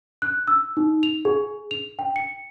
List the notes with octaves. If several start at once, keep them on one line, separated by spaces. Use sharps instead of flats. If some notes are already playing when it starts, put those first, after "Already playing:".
F#6
E6
D#4
F7
G#4
F7
G5
C#7